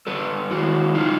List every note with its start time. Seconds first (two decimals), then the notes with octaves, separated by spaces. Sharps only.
0.07 G2 A4 B4
0.51 D#3 G#3 E4 F#4
0.95 C#3 D#4 F4